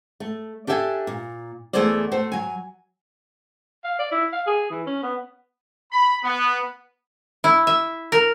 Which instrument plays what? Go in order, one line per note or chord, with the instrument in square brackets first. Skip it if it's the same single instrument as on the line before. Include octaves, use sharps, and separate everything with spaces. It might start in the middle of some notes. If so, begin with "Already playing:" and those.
[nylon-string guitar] A3
D4 G4 A4 E5 G5 G#5
A#2
E2 A3 E4 G#4 C5 D5
A3 F#4 C5
F#3 G#5
[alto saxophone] F5
D5
E4
F5
G#4
E3
C#4
B3
[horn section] B5
B3
[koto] E4
E5
A#4